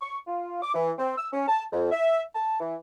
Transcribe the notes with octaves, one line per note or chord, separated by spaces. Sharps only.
C#6
F4
D6
E3
C4
E6
C#4
A5
F2
E5
A5
E3